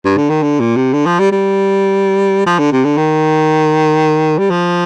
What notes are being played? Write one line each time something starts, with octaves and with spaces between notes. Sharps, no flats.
G2
D3
D#3
D3
A#2
C3
D3
F3
G3
G3
F3
D3
C3
D3
D#3
G3
F3